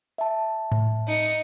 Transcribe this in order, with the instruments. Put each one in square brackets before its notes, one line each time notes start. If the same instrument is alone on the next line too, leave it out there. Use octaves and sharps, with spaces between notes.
[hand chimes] E5 A5
[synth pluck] A2
[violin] D#4 C#7